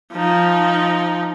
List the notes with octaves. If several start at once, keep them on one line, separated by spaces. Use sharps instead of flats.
F3 D#4